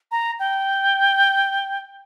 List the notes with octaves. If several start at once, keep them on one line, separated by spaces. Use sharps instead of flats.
A#5
G5